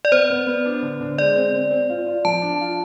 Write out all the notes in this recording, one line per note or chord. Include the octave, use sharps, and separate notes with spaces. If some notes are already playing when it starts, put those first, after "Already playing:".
D5
B3 C5
B3
B3
D4
D3
D3
G#3 D5
C4
C4
C4
F4
F4
F3 A5
D4
F4